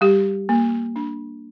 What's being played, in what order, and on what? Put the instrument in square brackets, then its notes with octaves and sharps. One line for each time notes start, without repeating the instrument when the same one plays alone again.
[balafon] G3 G4
A#3
D4